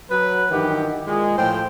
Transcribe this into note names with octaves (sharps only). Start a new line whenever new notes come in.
F#3 B4
G2 D#3 E3 G4 F#5
A#2 G#3
A2 F3 C5 G5